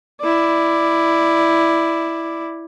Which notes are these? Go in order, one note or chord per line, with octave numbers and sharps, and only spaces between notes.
E4 D5